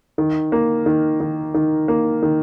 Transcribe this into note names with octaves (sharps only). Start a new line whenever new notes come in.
D#3
A#3
D#3
D#3
D#3
A#3
D#3